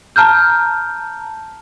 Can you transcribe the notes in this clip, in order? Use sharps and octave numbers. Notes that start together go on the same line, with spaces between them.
A5 A#5 F6 G6